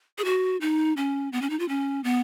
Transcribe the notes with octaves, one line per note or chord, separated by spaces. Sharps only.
G#4
F#4
D#4
C#4
B3
C#4
D#4
F4
C#4
B3